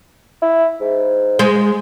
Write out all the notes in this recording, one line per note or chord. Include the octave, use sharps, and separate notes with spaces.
E4
G#2
G#3 C5